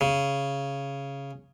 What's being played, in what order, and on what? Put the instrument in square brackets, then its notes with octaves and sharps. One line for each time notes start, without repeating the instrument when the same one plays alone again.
[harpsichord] C#3